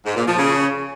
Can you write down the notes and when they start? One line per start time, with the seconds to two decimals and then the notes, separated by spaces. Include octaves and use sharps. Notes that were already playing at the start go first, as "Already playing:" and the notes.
0.05 G#2
0.16 A#2
0.27 F3
0.38 C#3